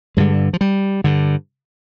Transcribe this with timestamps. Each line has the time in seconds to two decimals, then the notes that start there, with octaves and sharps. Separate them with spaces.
0.17 G2 D3 G#3
0.53 F3
0.61 G3
1.04 G2 D3